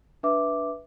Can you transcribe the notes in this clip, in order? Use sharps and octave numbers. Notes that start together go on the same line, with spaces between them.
D4 B4 E5 D6